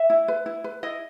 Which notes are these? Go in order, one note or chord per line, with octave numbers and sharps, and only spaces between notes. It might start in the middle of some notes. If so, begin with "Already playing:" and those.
Already playing: E5
E4
B4
E4
B4
E4 D#5